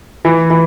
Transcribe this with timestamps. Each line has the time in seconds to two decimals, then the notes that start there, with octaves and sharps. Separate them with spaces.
0.25 E3
0.50 E3